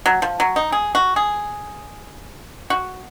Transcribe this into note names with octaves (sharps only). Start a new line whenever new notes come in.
F#3
F3
F#3
D#4
G#4
F#4
G#4
F#4